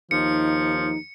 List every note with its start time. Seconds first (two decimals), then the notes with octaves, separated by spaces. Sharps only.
0.11 D#2 F3 D#4 C#7